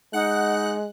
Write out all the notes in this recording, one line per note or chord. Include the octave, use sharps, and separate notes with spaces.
G#3 D#4 F#5 F#6